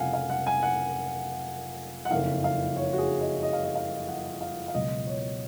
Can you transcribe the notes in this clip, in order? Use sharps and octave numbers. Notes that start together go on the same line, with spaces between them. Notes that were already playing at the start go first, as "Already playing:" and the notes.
Already playing: F1 F2 C#3 F3 F5 F#5 G#5
F5
F#5
G#5
F#5
F#5
F#1 F2 D#3 F5
F5
C#5
F#4
G#4
D#5
D#5
F5
D#5
F5
F#5
F5
F5
C#2 B2 F#3 D#5
C#5